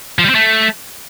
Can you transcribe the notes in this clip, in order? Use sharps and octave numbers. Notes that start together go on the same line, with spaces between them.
F3
G3
C4
A3